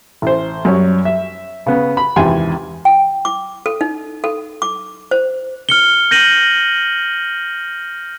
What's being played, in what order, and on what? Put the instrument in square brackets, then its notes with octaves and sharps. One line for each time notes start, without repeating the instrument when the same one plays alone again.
[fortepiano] A1 C5
F#2 G3 C#5 C#6
E5
C#3 B3
B5
G#1 E2 C3 G5 G#5 C6
[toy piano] G5
D6
A4
D#4
A4
D6
C5
[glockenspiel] F6 C#7 G7
G6 A#6 D#7 F#7